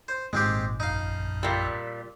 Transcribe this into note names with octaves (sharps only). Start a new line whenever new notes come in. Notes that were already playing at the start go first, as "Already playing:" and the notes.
C5
G#1 A#2 D#3 G#3 C4 G4
A#1 F#2 D#4 F5
A#2 G3 E6 F#6 B6